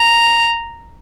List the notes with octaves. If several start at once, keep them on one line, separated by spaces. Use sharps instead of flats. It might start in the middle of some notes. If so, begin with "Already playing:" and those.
Already playing: A#5